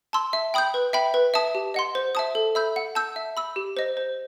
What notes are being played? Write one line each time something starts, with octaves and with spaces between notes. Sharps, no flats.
A5 C6 E6
E5
G5 B5 D#6 G6
B4
E5 G5 B5
B4
E5 A5 D#6
G4
D#5 F#5 C6
C5
E5 A5 D#6
A4
E5 B5 E6 G6
F#5
A5 E6 G6
E5
B5 E6
G4
C5 D#5
C5